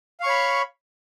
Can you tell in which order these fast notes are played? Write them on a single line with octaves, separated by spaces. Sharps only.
F5 C#6 C#5 B5